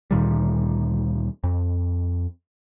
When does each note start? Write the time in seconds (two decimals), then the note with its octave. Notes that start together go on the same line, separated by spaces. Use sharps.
0.11 D2 A#2 D#3 G3
1.44 F2